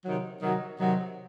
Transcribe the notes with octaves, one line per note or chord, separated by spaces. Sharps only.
C3 D#3 F#3
C3 D#3 F#3
C3 D#3 F#3